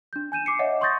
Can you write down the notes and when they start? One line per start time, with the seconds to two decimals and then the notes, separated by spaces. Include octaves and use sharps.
0.13 D4 G6
0.32 G#5 G6 D#7 E7
0.46 D6 C7 C#7
0.59 C#5 D#5 E5 F#5
0.81 C6 C#6 D#6 G6 A6 A#6